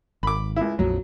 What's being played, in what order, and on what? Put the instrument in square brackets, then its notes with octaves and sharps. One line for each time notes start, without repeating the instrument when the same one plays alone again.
[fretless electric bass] G#1 [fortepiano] B5 D6
[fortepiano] C#2 E4
[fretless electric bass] A#1 F2 F3 [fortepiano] F#3